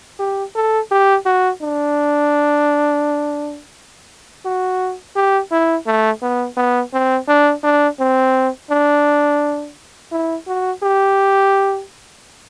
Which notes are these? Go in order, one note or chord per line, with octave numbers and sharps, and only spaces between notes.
G4
A4
G4
F#4
D4
F#4
G4
E4
A3
B3
B3
C4
D4
D4
C4
D4
E4
F#4
G4